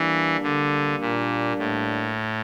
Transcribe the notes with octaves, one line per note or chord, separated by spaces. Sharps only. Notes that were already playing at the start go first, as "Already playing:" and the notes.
Already playing: E3 G3 A#3 D4
D3
A#2
A2